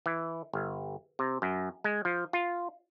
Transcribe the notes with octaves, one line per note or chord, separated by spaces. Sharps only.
E3
G1
C3
F#2
G#3
F3
F4